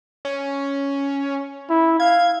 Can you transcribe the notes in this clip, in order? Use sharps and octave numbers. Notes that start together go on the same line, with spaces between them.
C#4
E4
F5 G#6